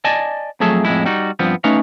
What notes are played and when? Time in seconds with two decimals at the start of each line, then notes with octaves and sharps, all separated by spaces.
0.04 D5 D#5 G#5 A5
0.60 F2 F#3 A3 G#4 E5 A5
0.85 F2 A2 G#3 E4
1.06 G3 D#4 F#4
1.39 G2 F3 B3 C4
1.64 A3 C#4 D#4 B4 C#5 F5